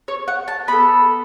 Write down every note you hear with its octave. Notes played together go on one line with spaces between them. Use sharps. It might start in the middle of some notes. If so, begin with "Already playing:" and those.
C#5
F#5
A5
B3 A4 B5